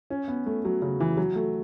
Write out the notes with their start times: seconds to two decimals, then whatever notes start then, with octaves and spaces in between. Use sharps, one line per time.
0.10 C#4
0.28 B3
0.46 A3
0.65 F#3
0.82 C#3
1.00 E3
1.17 F#3
1.36 A3